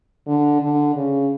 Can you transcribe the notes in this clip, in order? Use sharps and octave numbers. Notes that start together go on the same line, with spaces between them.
D3
D3
C#3